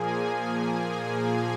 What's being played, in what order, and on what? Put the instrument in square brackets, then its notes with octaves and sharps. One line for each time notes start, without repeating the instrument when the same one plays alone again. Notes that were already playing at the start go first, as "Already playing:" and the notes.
Already playing: [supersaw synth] A#2 F3 A#3 G#4 G#5